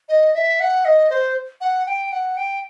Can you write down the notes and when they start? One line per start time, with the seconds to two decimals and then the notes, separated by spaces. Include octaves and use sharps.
0.09 D#5
0.35 E5
0.60 F#5
0.85 D#5
1.10 C5
1.61 F#5
1.86 G5
2.12 F#5
2.37 G5